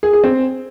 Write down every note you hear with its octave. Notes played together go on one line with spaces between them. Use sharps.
G#4
G#4
C4